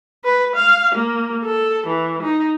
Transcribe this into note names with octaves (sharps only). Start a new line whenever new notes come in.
B4
F5
A#3
A4
E3
D#4